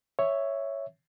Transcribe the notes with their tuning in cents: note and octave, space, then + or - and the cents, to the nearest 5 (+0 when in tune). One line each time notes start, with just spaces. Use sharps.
C#5 +0 E5 +0